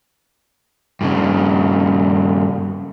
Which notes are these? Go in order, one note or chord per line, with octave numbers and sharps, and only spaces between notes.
G2 C#3